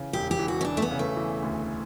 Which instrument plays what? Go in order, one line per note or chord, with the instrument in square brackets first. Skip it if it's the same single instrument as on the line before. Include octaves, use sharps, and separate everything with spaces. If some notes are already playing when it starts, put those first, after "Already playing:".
Already playing: [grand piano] C#3 E3
[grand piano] E1 [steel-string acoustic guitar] G4
[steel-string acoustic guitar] G4
[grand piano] E3
[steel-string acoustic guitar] F#4
C#4
[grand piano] E3 [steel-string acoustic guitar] D4
[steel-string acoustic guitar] A3
B3
[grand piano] C#3
[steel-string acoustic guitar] A3
[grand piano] E3
D2